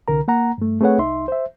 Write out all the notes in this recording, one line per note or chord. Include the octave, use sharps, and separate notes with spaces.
C2 D3 A#4 A#5
A#3 F#5 A#5
G2 A3
A3 C4 G#4 B4 C#5 F#5
C2 D#4 E5 C6
C5 E5